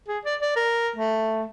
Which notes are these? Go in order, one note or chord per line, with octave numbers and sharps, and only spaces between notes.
G#4
D5
D5
A#4
A3